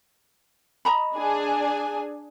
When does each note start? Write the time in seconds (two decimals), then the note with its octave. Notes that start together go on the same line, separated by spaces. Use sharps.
0.85 D#5 A#5 B5
1.16 D4 G#4 G#5